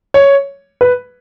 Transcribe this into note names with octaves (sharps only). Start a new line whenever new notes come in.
C#5
B4